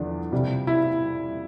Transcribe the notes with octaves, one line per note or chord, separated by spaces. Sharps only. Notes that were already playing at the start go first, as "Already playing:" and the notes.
Already playing: E2 D3 F3 D4
F2 C3 G3
E4